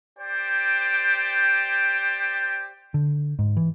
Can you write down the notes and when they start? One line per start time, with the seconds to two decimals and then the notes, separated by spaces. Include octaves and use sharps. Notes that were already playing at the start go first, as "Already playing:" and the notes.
0.18 G4 C5 D5 G5
2.94 D3
3.39 G#2
3.57 E3